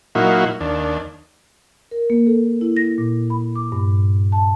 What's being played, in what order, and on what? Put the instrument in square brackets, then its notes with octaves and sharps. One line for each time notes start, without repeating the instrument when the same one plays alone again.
[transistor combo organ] A#2 F#3 A#3 D#4 E4 F#4
D#2 D4
[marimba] A#4
A#3
A4
E4
A#6
A#2
B5
D6
G2
A5